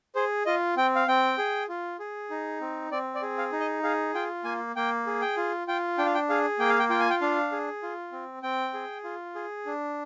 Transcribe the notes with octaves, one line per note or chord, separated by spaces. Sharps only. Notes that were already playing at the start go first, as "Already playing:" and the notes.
G#4 C5
F4 D#5
C4 G5
F5
C4 G5
G#4
F4
G#4
D#4
C4
C4 D5
D5
G#4
F5
D#4
D#5
G#4 F5
F4 G5
A#3 G#5
A#3 G5
G#4
G5
F4
F4 G5
D4 G5
F5
G5
G#4 F5
A#3 G5
F5
G5
F4 G5
G#5
G5
D4 F5
G#4
F4
C4
C4 G5
G#4
F4
G#4
D4